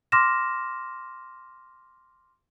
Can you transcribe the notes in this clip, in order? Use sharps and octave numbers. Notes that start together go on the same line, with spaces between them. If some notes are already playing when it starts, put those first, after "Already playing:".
C6 D6 F6 A#6 E7